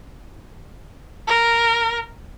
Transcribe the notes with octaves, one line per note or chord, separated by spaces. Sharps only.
A#4